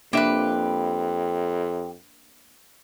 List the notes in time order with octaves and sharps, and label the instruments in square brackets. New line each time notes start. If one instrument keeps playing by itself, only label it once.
[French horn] F2 [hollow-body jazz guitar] A#3 D4 E5 [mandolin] G4 B4